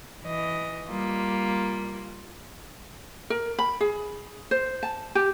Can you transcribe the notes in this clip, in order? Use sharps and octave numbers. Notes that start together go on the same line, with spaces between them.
E3 D#5
G3 A#3 F4
A#4
B5
G#4
C5
A5
G4